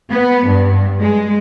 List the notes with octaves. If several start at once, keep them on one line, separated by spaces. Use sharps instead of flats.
B3
G2
G#3